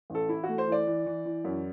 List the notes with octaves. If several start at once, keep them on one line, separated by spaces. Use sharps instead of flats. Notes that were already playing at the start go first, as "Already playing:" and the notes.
A1 A4
E3 E4
F#4
A3
C5
E3 D5
E3
E3
E3
F#2